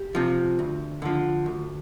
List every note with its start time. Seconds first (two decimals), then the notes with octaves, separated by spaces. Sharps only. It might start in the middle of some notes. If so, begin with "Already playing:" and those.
Already playing: G4
0.15 C3 F3
0.59 D2
1.02 D3 F3
1.46 D2